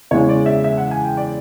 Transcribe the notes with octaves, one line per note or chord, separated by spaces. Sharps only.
E2 C#3 E3 G#3 C#5
D5
E5
E5
F#5
G#5
G5
D5